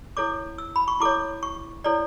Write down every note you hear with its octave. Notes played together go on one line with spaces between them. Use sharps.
E4 A4 C#5 D6
E6
B5
C#6
E4 A4 C#5 D6
C#6
E4 A4 C#5 D5